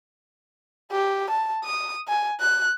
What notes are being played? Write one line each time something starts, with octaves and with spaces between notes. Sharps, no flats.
G4
A5
D#6
G#5
F#6